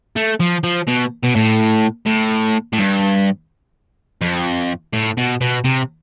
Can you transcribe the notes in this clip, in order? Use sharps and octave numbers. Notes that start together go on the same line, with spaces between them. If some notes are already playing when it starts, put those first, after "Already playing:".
A3
F3
F3
B2
B2
A2
A2
A2
G2
F2
A2
B2
B2
C3